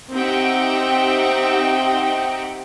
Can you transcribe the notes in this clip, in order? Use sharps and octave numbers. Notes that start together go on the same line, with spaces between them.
C4 D#4 G4 E5 F#5 G5